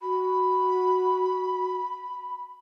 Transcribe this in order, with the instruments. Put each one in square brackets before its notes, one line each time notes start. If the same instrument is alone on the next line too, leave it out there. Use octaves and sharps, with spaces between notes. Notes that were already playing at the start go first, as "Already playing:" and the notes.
[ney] F#4 [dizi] B5